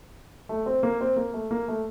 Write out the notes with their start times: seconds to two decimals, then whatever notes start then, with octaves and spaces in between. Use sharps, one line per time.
0.49 A3
0.66 C4
0.83 A#3
1.01 C4
1.16 A#3
1.34 A3
1.51 A#3
1.68 A3